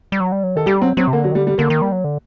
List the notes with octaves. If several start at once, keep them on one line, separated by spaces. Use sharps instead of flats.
G3
F#3
G3
F#3
D#3 A4
G3 G4
F#3 C4
F#3 C4
C3
D3 A#3
F#3
D#3
D3 G3
G3
D3 A#3
D#3
G3
F#3
D3